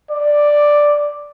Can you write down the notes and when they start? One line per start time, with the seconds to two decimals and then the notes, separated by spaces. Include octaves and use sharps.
0.11 D5